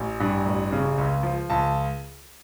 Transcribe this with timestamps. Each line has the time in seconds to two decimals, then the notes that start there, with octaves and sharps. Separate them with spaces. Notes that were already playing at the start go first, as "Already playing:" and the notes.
Already playing: A1
0.20 G2
0.46 A1
0.72 C#3
0.98 C#2
1.23 F3
1.50 C#2 A5